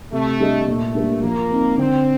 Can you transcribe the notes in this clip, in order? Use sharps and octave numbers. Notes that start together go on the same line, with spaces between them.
C3 A3
G3 D4 A4 D#5
A#2 A3
G3 A#3 D4
F3 A#3
C4 D#4
D3 C4